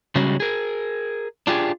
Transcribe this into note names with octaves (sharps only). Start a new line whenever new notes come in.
C#3 G3 G#3 C#4 F#4
G#4 A#4
D4 F4 G4 G#4